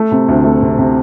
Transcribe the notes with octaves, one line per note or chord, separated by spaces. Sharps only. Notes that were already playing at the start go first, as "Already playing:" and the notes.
Already playing: A3
C3
D2
A3
C3
C3